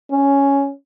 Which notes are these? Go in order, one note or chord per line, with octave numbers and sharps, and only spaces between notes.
C#4